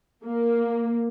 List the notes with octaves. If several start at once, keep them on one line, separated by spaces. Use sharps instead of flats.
A#3